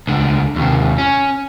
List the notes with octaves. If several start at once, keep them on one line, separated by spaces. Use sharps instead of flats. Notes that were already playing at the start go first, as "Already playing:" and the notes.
C#2 D3
D#2 C3
C#4